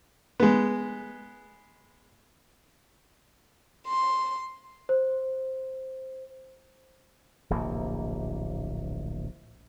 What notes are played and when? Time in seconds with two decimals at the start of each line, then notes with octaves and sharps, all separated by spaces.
0.40 G#3 B3
3.87 C6
4.89 C5
7.50 D1 A#1 C3 A#3